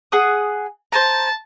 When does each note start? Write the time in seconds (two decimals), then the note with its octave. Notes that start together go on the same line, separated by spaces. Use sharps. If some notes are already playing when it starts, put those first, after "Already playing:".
0.12 G#4 F#5 D#6
0.92 C5 A5 A#5